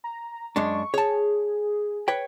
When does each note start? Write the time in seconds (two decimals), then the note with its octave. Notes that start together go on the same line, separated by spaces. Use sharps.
0.04 A#5
0.56 F#2 G#3 D4 C#6
0.94 G#4 C#5 A5
2.08 B4 C#5 G5